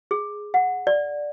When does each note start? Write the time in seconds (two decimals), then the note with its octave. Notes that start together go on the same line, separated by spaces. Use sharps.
0.11 G#4
0.54 F#5
0.87 D5